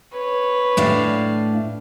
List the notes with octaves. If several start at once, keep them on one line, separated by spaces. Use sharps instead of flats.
B4 C#5
A2 D4 F5